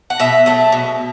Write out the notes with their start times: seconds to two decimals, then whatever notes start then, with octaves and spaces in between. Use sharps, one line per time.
0.10 F#5
0.19 B2 E5
0.46 F#3 A3
0.72 B2